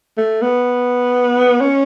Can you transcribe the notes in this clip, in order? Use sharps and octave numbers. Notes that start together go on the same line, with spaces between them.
A3
B3
C#4